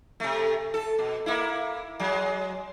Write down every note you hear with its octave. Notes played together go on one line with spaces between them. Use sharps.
C3 A3
A4
B2
A#3 E4
F#3 G#3